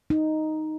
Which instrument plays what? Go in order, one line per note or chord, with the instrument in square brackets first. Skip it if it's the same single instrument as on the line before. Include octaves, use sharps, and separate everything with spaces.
[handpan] D#4